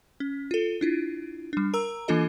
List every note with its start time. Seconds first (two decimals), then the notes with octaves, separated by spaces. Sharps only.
0.20 C#4
0.51 F4 A4
0.81 D4 E4 F4
1.53 G3 D4
1.74 A#4 A#5 E6
2.08 E3 A#3 D4 F4 A4 D#5